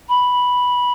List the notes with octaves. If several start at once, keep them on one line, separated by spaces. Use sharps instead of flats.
B5